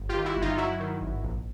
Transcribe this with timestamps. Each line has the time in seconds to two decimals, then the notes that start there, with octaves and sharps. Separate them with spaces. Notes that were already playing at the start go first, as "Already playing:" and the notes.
Already playing: G1
0.09 F4 G4
0.14 D#3
0.25 E4 F#4
0.36 G1
0.42 D#4 F4
0.58 F#3 E4 F#4
0.80 D#3
1.01 G#1
1.23 A#1